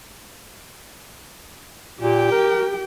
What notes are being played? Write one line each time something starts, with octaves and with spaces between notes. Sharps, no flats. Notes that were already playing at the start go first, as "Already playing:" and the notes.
A#2 G4 G5
A#4